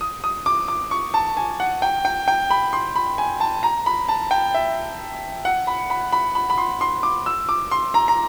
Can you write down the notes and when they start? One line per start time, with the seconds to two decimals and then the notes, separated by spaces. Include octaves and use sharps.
0.01 D#6
0.24 D#6
0.46 D6
0.68 D6
0.91 C#6
1.14 A5
1.37 G#5
1.60 F#5
1.82 G5
2.05 G5
2.28 G5
2.50 B5
2.73 C6
2.96 B5
3.18 G#5
3.40 A5
3.63 A#5
3.86 B5
4.09 A5
4.31 G5
4.54 E5
5.45 F#5
5.67 B5
5.90 B5
6.12 B5
6.35 B5
6.50 B5
6.58 C6
6.81 C6
7.03 D6
7.26 E6
7.49 D6
7.71 C6
7.94 A#5
8.08 A#5